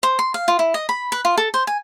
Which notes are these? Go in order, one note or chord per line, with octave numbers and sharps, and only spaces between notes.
C5
C6
F5
F4
E4
D#5
B5
B4
F4
A4
C5
G#5